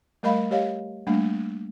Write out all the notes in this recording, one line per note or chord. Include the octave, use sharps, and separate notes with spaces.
G3 A3 A#4 D#5 F5 B5
G4 C#5 D#5 F5
G3 A3 A#3 D4